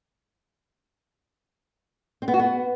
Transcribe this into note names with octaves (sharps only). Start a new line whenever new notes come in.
C4
B3
F#4
B3